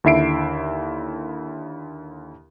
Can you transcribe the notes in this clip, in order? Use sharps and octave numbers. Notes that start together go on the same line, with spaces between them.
D#2 D3 E4 E5 C7 D7